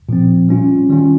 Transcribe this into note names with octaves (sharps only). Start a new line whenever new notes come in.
A#2 F3 C4
G3 C#4 F4
D#3 G3 C#4 F4